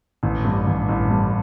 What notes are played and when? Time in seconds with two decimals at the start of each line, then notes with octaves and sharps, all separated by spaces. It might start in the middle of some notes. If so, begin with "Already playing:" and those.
0.23 A1
0.45 G2
0.67 A1
0.89 A1
1.10 G2